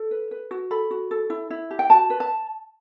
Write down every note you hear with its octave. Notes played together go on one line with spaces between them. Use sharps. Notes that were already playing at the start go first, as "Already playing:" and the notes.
Already playing: A4
B4
B4
F#4
A4 B5
F#4
A4
E4
E4
G4
G5
F#4 A5
B4
A5